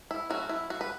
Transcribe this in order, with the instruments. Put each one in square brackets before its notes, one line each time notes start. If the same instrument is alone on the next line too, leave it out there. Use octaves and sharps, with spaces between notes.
[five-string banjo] E4
F#3 A3 C#4 F#4
E4
F#4
B4